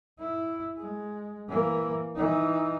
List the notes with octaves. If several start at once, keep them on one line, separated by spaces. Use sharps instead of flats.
E4
G#3
E3 A#3
E3 D#4